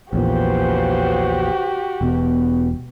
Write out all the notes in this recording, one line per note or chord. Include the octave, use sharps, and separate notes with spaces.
A#1 E2 A#2 C#3 F#4 G4 B4 C5
E1 B2